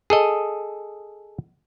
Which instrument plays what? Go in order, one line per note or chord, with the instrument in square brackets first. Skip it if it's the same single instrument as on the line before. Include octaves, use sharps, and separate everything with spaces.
[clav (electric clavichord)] G#4 A4 D#5